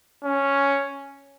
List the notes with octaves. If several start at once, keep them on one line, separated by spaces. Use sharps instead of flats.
C#4